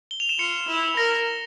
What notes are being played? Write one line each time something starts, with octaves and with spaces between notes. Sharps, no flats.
G7
F7
E7
F4 C#7
E4
A#4 A#6